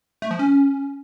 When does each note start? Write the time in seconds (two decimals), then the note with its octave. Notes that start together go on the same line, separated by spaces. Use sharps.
0.22 A3
0.31 F3
0.39 C#4